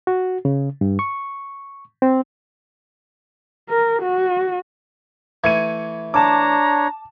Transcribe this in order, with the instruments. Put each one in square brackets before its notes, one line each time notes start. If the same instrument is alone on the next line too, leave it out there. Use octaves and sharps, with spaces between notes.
[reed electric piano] F#4
C#3
G2
C#6
C4
[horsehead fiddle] A#4
F#4
[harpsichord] E3 A3 [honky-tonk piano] G#6 C#7 D#7
[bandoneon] D4 C#5 [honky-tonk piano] A5 D6 [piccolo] A#5